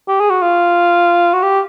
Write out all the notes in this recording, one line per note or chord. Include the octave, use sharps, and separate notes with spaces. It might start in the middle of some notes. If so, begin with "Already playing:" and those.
G4
G#4
F#4
F4
F#4
G4